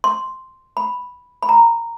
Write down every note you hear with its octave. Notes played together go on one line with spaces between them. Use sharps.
C6
B5
B5
A#5